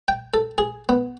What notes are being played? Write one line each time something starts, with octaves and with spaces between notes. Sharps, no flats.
G5
A4
G#4
B3